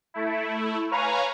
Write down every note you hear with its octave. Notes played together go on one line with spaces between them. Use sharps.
A3 E4
B4 C#5 F5 G#5 A#5